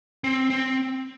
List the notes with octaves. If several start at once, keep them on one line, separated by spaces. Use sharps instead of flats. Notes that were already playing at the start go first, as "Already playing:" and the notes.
C4
C4